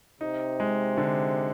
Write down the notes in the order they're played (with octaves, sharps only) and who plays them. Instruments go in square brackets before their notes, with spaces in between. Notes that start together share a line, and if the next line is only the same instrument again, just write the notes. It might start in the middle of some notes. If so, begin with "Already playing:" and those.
[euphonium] C3 [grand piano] D#4
[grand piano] G#3
D3